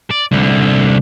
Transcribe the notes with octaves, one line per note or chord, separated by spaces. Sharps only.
D5
C2 D3